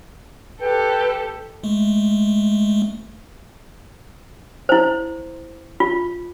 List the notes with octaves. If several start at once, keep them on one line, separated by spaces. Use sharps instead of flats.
G4 A4 B4
G#3 A3
E4 C5
F4